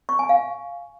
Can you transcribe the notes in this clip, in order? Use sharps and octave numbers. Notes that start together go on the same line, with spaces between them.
C#6
G#5
F5